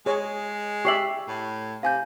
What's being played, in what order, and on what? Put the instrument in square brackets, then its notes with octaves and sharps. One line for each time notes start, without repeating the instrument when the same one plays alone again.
[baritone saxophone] G#3 [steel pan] G#4 C#5
[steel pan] G4 D5 E5 [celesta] C#6 C7 F#7
[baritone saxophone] A2
[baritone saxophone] C3 [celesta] F5 G#5 G6